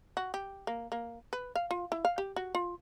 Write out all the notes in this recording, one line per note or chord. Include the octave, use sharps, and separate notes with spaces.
F#4
G4
A#3
A#3
B4
F5
F4
E4
F5
G4
F#4
F4